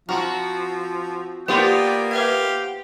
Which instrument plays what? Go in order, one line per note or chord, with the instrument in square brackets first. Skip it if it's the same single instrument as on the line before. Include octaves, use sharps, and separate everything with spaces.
[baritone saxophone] F3 [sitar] C4 F#4 [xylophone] A#5 F6
[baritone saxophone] A#3 [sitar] B3 F4 C5 [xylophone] G4 [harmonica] D5 G5
[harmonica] G4 F5 [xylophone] B4 E5 G#6